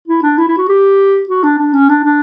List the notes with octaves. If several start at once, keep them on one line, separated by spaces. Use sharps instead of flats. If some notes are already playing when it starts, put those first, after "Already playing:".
E4
D4
E4
E4
F#4
G4
F#4
D4
D4
C#4
D4
D4